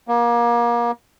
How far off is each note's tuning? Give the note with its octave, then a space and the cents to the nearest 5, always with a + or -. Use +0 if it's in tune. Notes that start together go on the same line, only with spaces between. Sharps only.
A#3 +30